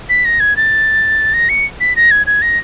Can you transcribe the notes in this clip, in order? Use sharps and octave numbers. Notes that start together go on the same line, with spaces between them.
B6
A#6
G#6
A6
A#6
C#7
B6
A#6
G#6
G#6
A#6